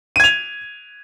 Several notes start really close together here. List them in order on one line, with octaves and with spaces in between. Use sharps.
D#7 G#6 F7